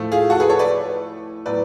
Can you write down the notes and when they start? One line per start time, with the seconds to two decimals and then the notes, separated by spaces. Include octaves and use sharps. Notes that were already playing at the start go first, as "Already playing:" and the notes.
Already playing: A2 F3 A3
0.12 F4 G#4
0.30 F#4 A4
0.40 G#4 B4
0.50 A4 C#5
0.59 B4 D5
1.46 A2 F#3 B3 B4 D5